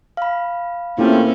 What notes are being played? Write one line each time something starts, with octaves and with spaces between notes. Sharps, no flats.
F5 B5
A3 A#3 C4 C#4 E4 F4 G4